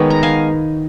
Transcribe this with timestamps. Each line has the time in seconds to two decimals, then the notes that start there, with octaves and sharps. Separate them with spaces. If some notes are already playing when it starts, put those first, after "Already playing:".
Already playing: D#3 G#3 B3 C#5
0.10 A#5
0.23 F5 G#5